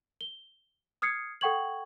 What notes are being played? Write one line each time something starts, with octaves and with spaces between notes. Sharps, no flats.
G7
D#6 F6 G#6 C7 C#7
A4 F#5 G5 C#6 G#6 F#7